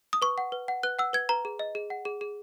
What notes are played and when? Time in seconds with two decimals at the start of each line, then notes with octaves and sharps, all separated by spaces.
0.13 D#6
0.22 B4 C#6
0.38 F#5
0.52 B4
0.68 F#5
0.83 B4 F#6
0.99 F#5 E6
1.13 B4 G#6
1.29 B4 A#5
1.45 G#4
1.59 D#5
1.75 G#4
1.90 F#5
2.05 G#4
2.21 G#4